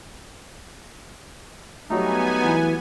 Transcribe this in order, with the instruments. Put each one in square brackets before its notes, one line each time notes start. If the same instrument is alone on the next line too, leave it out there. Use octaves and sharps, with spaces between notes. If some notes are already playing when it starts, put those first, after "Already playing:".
[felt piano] F#3 G3 A3 [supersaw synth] B3 G#5 [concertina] D#4
[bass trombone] E3